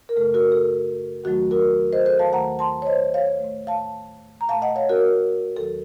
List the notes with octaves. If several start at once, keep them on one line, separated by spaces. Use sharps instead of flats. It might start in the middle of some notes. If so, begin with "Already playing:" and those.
A#4
F#2 C#3 A3 A4
F#4 A#4
A4
D#2 D#3 F#3 A3 F#4
F#4 A#4
C5 D#5
A4 C5
F5 A5
D#2 D#3 A3 F#5 A#5
A5 C6
C#5
C5 D#5
C#5 F5
A2 A3
F5 A5
A#5
A#2 F5 A5
A3
D#5 F#5
C#5 F5
F#4 A#4
D#2 D#3 F#3 A4